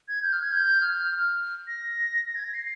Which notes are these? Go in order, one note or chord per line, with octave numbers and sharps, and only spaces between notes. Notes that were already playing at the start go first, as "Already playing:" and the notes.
G#6
G6
F6
G#6
G6
F6
A#6
A#6
G#6
A#6
C7